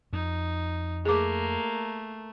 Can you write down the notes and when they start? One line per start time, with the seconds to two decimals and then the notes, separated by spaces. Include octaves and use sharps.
0.13 F2 D#4
1.05 A3 A#3 G#4 D6